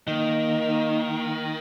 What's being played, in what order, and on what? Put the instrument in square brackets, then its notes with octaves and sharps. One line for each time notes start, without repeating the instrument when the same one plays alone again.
[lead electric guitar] D#3 [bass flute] A#3 [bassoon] D#4